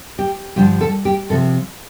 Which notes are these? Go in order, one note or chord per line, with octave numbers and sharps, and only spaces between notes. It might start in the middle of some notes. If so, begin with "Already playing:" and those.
G4
G2 D3 F3 G4
A4
G4
C3 F3 A4